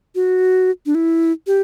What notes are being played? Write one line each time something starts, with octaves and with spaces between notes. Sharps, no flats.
F#4
D4
E4
G4